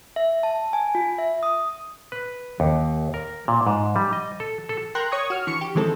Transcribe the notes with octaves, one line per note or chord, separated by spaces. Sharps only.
E5
A5
G#5
F4
E5
D#6
B4
D#2
A#4
A#2
G#2
G3
D#5
A4
A4
A#4 G5 C6 F#6 A#6
C#5 C#6 D#6 G#6
F#4 F6
D3 E3 C#6 C#7
G4
D#3 E3 G#3 C4 A4